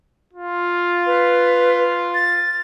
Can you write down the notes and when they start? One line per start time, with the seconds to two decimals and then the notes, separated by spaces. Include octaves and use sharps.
0.33 F4
1.06 B4
2.14 A6